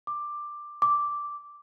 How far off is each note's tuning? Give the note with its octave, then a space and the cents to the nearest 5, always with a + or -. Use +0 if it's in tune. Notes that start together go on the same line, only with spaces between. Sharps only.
D6 +10
D6 -5